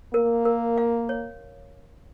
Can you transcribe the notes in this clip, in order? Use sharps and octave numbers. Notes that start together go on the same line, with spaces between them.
A#3 A#4
A#4
F5
C#5